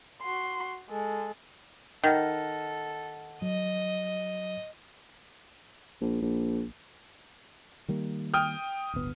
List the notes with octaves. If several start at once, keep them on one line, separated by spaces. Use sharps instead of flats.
F#4 C6
G#3 A4
D#3 A4 F#5 F6 A#6
F#3 D#5
A#1
A#1
D#3 G3 A#3
G5 D#6 F6
D1 G1 B3